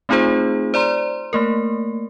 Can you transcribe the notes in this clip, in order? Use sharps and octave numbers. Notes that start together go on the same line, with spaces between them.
A3 C4 D#4 F4 G#4 C5
C5 D5 A#5 C6
A3 A#3 A#4